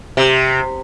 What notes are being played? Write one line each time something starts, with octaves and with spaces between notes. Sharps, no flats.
C3